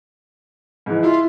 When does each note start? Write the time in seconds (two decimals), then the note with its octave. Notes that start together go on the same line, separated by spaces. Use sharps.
0.86 G#2 E3
1.03 E4 F4